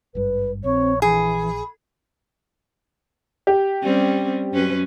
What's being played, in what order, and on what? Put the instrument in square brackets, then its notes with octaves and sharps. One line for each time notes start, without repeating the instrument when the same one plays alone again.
[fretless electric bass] G#1 G2 [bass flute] B4
[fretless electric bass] A#1 [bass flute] C4 [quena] C#5
[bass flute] E3 [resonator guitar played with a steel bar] G#4 [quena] B5
[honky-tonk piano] G4
[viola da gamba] G3 C4 C#4
F#2 C#4 B4